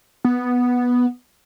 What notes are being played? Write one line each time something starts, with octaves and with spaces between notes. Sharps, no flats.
B3